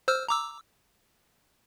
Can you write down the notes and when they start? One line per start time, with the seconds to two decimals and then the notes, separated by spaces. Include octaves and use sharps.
0.08 C5 E6 F6
0.29 A#5 D6 E6